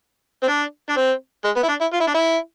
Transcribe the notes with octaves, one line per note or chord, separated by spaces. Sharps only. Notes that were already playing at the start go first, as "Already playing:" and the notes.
C4
D4
D4
C4
G#3
B3
E4
D4
E4
F4
E4
D4
E4